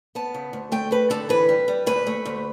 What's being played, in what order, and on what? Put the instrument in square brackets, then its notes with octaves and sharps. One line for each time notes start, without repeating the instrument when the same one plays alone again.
[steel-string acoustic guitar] B3 A5
C#3
D2
A3 G5
A3 B4
D3 A4
E3 B4
G3
G3
D2 B4
A3
D2